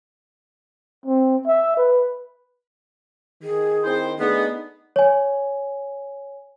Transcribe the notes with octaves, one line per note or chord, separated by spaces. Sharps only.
C4
E5
B4
D#3 G#4
C4 E4 C5
A3 B3 D4 D#4 G#4
C#5 G#5